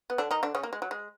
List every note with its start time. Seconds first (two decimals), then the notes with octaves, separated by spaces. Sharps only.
0.10 B3
0.18 D3 D4
0.31 D#3 D#4
0.43 D3 D4
0.55 C#3 C#4
0.63 A#3
0.73 G#3
0.82 F#3
0.91 G#3